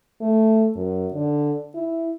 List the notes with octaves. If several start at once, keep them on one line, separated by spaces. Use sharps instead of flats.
A3
F#2
D3
E4